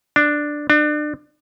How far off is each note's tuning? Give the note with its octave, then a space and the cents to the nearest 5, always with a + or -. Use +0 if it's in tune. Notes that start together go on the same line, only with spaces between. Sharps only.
D4 +5
D4 +30